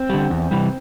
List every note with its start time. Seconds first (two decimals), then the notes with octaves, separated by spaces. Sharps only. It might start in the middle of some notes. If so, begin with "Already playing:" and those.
Already playing: C4
0.10 D3 G3
0.30 E2
0.51 C3 E3 G3